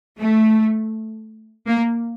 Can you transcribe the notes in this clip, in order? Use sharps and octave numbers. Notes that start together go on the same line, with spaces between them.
A3
A#3